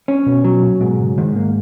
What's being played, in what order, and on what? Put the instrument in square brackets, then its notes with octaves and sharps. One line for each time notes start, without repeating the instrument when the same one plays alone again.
[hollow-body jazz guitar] C#4
[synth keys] B2
[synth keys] B2 [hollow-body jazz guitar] F#3
[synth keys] A#2
[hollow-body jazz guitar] G#2 [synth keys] B2
[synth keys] C#3
[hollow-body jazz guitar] G#2 [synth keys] D#3
[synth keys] A#3